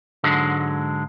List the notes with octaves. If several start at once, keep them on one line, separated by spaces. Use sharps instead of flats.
G#2 D3 F#3 G#3